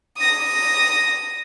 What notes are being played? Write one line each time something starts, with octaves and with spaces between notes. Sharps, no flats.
D#6 A#6